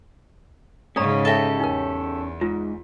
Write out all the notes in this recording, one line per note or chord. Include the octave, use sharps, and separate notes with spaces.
G#2 C#3 C#4 A4 C#5 D5 A#5
G4 A4 D#5 E5
E2 D#4 A#4
G#2 F4